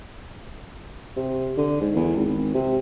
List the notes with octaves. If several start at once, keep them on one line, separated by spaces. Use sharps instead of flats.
C3
D3
G#2
E2
G#1
C3